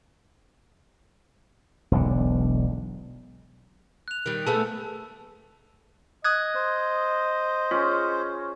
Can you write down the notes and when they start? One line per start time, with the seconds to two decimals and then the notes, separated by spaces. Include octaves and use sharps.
1.91 E1 B1 D3
4.08 F#6 F7
4.26 D#3 G3
4.47 A3 B3 G#4 A5 E6
6.24 D#5 D#6 F#6 G#6
6.55 C5
7.71 C#4 F4 G#4